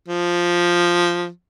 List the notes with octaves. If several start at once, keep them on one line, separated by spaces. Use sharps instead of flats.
F3